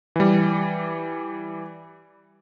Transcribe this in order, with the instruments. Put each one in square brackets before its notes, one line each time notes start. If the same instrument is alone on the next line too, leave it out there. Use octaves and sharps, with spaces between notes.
[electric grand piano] E3 G3